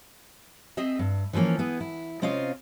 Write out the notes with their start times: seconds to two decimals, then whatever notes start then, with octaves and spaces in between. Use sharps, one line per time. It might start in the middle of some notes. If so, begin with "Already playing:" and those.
0.77 C4 G#4 D#5 E5
0.99 G2
1.33 E3 F3 G3 A#3 C#4
1.59 B3 E4 G#4
1.81 E4
2.22 C3 C4 C#4 F4 D#5 F5